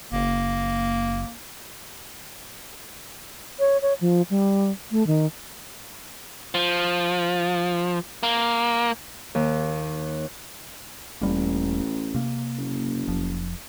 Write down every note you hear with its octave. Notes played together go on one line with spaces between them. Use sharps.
F#1 A#3
C#5
C#5
F3
G3
A3
D#3
F3
A#3
D#2
E1 A1 G3 A#3
C3 A#3
F#1
F1 F3